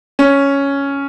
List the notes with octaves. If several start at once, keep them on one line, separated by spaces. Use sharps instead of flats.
C#4